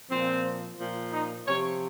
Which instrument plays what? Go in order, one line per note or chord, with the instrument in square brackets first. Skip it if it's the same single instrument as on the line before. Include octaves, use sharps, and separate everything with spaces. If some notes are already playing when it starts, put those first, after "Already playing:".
[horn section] A#2 F3 C4
A#2 F3
D#4
C3 F3 C#5